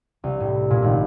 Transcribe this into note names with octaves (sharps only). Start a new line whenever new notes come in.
C2
A2
A#2
G#1